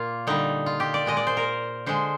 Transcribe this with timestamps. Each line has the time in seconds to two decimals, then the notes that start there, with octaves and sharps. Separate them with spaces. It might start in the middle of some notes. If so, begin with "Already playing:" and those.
Already playing: A#2 A#3 F4
0.27 D3 G3 D#4
0.66 F4
0.80 G4
0.94 D5
1.06 A#2 G#3 D#5
1.17 D5
1.27 C5
1.37 A#4
1.86 D3 G#3 C5